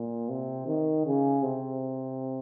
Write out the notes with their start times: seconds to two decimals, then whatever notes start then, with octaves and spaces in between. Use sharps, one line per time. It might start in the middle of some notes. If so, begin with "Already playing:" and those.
Already playing: A#2
0.29 C3
0.67 D#3
1.06 C#3
1.43 C3